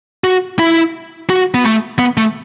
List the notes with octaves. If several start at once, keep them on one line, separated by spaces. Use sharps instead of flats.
F#4
E4
F#4
B3
A3
B3
A3